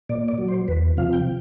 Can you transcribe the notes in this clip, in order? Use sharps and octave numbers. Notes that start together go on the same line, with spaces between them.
A#2 D5
D5
F#3
C5
E2 B4
C3 F3 F5
G5